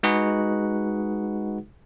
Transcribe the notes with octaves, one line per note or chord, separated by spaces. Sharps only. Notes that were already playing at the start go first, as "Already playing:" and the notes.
G#3 D#4 F#4 G#4 B4 F#5